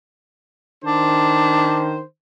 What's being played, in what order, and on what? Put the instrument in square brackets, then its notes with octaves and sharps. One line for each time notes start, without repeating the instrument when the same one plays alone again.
[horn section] D#3 C5 [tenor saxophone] D4